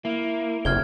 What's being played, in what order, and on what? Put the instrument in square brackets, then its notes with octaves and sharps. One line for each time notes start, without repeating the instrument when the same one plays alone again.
[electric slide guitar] A#3 [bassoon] E4
[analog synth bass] F#1 [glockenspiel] F6 G#6 G7